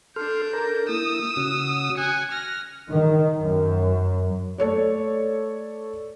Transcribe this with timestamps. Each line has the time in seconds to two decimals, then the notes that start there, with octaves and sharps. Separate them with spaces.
0.16 D4 A4 C6 F6 G6
0.53 A4 A#4 A#5
0.89 A#3 E4 D#6 E6
1.37 C#3 C#4 F#4
1.97 G#5 F#6 C#7
2.31 F6 A#6
2.90 D#3
3.40 F#2
4.58 A3 A4 C#5 D5